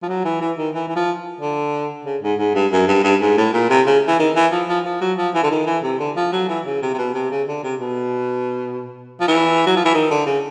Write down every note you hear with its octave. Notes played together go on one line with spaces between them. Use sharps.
F3
F#3
E3
E3
D#3
E3
E3
F3
D3
C#3
G#2
G#2
G2
F#2
G2
G2
G#2
A2
A#2
C3
C#3
E3
D#3
E3
F3
F3
F3
F#3
F3
E3
D3
D#3
E3
C3
D3
F3
F#3
E3
C#3
C3
C3
B2
C3
C#3
D3
C3
B2
F3
E3
F#3
F3
E3
D#3
D3
C#3